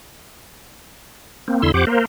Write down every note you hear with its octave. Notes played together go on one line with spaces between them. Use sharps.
A#3 C4
E2 D3 E4 C6 E6
F2 G4 C5 F#5 D6
A#3 A#4 C5